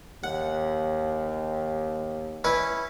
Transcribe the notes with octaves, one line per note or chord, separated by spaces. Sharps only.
D#2 F#5
C#4 E4 B4